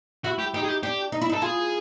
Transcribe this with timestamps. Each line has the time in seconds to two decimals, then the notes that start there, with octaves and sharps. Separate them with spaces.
0.24 E4 F#4
0.39 G4
0.54 D#4 G4
0.64 G#4
0.68 G4
0.83 D4 G4
1.12 D#4
1.21 E4
1.30 D#4 A4
1.42 F4 G#4